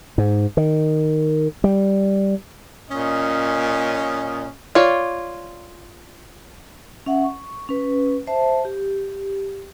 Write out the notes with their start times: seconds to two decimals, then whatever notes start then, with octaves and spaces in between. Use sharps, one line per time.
0.18 G#2
0.57 D#3
1.64 G3
2.90 A#2 C#4 D#5
4.75 F4 C#5 D5
7.06 C#4 E5 F#5
7.24 C#6
7.69 C#4 B4
8.27 C5 E5 A5
8.65 G4